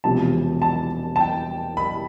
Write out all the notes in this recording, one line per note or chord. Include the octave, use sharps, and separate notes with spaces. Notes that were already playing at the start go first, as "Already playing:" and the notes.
E1 E2 C3 F3 A5
A5
A5
G5
B5